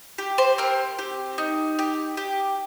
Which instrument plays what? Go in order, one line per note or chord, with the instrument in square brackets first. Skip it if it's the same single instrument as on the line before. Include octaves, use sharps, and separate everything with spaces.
[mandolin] G4
C5
C4 A#4
G4
D#4
G4
G4